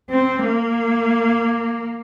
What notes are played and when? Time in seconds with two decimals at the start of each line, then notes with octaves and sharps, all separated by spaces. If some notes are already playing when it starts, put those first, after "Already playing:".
0.11 C4
0.44 A#3